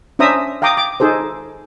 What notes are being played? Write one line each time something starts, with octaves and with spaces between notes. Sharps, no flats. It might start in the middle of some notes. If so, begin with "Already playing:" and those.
C#4 D4 C5 E5 A#5 D#6
F5 G5 A#5 D6 D#6
D6
D#4 G#4 A4 C5